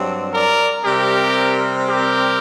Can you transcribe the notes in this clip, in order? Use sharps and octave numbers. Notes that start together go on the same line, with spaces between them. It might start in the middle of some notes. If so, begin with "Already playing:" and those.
Already playing: G2 F#3 C4
A#4 D5
C3 G3 C4 G4 A#4
G4 A#4